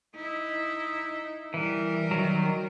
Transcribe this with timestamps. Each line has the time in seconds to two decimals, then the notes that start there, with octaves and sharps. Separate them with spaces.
0.16 D#4 E4
1.54 E3 G3 A#4
2.11 D#3 F#3